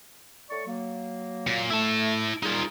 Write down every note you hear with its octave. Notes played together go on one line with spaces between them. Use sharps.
A2 D5 C#6
F#3 A#3
A#2
A3 E4 A5
C2 G3 D#4 F4 G#4